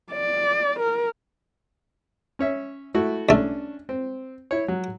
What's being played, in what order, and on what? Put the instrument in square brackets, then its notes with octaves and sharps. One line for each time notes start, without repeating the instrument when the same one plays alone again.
[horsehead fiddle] D5
A#4
[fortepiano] C#4 C#5 E5
A3 E4 F#4
[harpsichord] C2 A3 [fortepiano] C#4 D4
[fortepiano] C4
E4 C#5
F#3